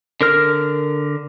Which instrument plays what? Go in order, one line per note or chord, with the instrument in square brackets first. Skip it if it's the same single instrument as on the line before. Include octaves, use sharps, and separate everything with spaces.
[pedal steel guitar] D3 A#4 F6